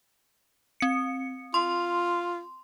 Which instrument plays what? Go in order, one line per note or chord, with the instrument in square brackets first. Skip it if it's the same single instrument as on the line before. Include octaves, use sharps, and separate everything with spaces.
[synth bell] C4 C#7
[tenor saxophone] F4 [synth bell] C6